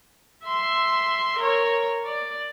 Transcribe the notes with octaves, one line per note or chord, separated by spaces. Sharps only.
E5 C6
A#4 C#5
D5